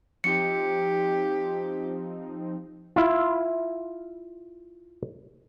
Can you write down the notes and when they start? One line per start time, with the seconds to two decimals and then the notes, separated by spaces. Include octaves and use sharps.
0.24 F3 C4 D#4 G4 C#7
2.96 E4 F4